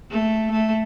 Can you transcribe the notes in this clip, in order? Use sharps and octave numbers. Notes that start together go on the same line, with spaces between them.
A3
A3